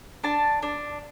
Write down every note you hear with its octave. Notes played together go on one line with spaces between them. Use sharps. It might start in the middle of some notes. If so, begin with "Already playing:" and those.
D4 A5
D4